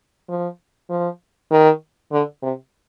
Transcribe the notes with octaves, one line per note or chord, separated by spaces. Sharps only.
F3
F3
D#3
D3
C3